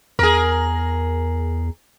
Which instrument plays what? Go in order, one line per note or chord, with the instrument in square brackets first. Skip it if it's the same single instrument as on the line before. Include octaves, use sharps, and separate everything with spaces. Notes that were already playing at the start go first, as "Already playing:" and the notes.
[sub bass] E2 [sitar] G#4 A#4